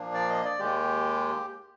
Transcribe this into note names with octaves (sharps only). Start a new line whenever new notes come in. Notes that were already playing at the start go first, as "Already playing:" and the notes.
Already playing: A#2 F3 A#3 D4
D5
D#5
D5
D#2 D#3 G#3 G4